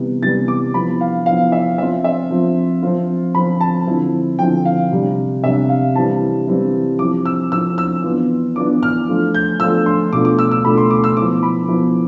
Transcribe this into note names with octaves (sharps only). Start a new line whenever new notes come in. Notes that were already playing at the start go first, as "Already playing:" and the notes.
Already playing: C3 E3 G3 B3
C3 E3 G3 B3 A6
D6
F3 B3 E4 B5
F5
F3 B3 E4 F5
E5
F3 C4 F4 E5
E5
F3 C4 F4
F3 C4 F4
F3 C4 F4 B5
A5
D3 F3 C4 E4
D3 F3 C4 E4 G5
F5
C3 G3 D4
C3 G3 D4 E5
F5
E3 G3 C4 E4 A5
E3 G3 C4 E4
F3 C4 E4 D6
E6
F3 C4 E4 E6
E6
E3 B3 D4 F4
E3 B3 D4 F4 D6
F6
F3 A3 D4 F4
G6
F3 A3 D4 F4 E6
C6
B2 A3 D4 F4 D6
D6
E6
E6
B2 A3 D4 F4 B5
C6
D6
E6
F3 B3 E4 D6
B5
F3 B3 E4